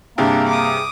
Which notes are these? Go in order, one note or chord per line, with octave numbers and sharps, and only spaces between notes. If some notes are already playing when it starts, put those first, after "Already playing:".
G2 C3 A#3 D4 G#4 E5 G5
D6 D#6